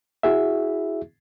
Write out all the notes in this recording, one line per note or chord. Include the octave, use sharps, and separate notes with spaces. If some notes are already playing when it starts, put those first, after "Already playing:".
E4 F#4 G#4 E5